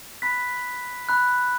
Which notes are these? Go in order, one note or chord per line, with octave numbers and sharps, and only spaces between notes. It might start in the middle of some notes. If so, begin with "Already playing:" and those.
B5 F#6 B6
B5 F#6